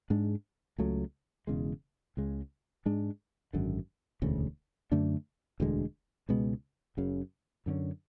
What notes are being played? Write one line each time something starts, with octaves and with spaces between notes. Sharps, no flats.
G#2 G#3 D4
C#2 C#3 F#3 A3
E1 E2 C#3 G#3
C#2 C#3 G#3
G#2 G#3 D4
G#1 F#2 D3
E1 D2 C#3
F#2 D3 A3 D4
E1 D2 D3 G#3
C#2 B2 G#3 B3
F#1 F#2 C#3
F#2 D3 A3 C#4